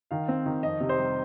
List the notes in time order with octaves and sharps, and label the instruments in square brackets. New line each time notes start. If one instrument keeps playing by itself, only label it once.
[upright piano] D#3 [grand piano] F5
[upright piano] C4
D#3
[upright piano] F2 [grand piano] D#5
[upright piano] C3
[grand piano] C5
[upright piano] G3